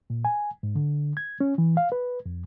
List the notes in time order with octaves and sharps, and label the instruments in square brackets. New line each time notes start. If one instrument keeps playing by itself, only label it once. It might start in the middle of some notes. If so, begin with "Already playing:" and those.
[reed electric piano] A#2
G#5
G#2
D3
G#6
C#4
E3
F5
B4
F2